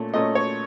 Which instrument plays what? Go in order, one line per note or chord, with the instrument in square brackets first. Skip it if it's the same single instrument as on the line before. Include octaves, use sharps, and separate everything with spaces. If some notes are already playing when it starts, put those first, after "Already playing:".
Already playing: [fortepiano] A#2 A3 C#4
A#2 A3 C#4 D#5
C#5